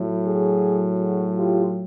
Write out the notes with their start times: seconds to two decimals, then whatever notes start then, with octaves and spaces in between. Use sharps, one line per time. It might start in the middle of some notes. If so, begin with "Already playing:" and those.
Already playing: A2 F#3
0.25 F#4 G#4
0.99 F#4 G#4
1.36 F4 G4